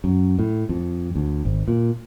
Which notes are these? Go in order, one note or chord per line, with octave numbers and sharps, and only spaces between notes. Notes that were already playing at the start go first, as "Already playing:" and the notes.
F#2
A2
F2
D2
G#1
A#2